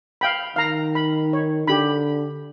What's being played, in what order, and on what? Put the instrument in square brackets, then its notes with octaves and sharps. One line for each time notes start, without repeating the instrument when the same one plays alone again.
[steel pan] F5 G5 B5
[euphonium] D#3 [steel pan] F5 A#5
[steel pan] B5
C#5
[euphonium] D3 [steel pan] G4 B5